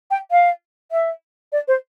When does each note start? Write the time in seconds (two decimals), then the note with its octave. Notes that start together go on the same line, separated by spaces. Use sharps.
0.11 G5
0.31 F5
0.92 E5
1.52 D5
1.68 C5